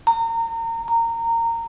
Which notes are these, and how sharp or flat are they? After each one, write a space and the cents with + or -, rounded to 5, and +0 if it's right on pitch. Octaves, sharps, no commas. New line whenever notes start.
A#5 -30
A#5 -20